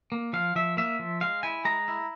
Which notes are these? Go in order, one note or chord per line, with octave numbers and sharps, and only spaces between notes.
A#3
F3 F5
F3 E5
A#3 E5
F3
G#3 F5
E4 G#5
G#3 A#5
E4